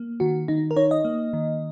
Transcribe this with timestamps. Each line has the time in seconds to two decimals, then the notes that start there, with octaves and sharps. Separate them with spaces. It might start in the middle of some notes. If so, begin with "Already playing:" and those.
Already playing: A#3
0.20 D#3 F#4
0.48 D#3 D#4
0.71 A#4
0.76 D#4 C#5
0.91 D#5
1.05 A#3
1.33 D#3